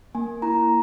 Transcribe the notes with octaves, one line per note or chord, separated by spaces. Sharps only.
A#3 G#5
E4 A#5